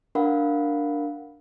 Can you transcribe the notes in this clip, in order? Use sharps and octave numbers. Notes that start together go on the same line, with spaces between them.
D4 A#4 F5 F#5 B5